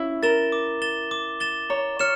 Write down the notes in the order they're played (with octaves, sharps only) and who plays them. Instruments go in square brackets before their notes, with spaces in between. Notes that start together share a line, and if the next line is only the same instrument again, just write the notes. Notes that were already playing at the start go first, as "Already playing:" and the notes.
Already playing: [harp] C#4 E4
[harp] A#4 [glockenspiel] A6 E7 G7
[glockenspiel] D6
A6 E7 G7
D6
A6 E7 G7
[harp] C#5 [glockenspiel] A#5
[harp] C#5 [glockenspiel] F6 C#7 E7